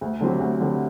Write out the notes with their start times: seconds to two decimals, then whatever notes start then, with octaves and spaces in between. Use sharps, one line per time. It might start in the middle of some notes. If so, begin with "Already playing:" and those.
0.01 D2
0.21 D3 F#3 C4 G4
0.40 D2
0.59 D3 F#3 C4 G4